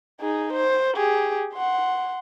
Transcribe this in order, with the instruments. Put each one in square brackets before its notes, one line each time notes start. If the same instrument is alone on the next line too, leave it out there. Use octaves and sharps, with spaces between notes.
[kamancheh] D#4 G#4
C5
G4 G#4
F#5 C6